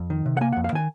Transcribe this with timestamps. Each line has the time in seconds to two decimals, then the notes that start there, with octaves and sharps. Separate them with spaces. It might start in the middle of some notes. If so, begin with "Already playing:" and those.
Already playing: F2
0.10 D#3
0.26 C3
0.37 F#5
0.41 A#3 G#5
0.52 F2 F#5
0.64 F5
0.73 D#3 G#5